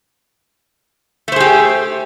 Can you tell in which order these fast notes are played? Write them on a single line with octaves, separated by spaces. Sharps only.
A3 C5 G#4 G4